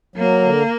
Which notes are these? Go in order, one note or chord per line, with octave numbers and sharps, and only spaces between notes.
F#3 A#3
D3